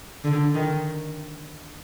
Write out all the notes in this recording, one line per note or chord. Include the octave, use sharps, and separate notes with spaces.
D3
D#3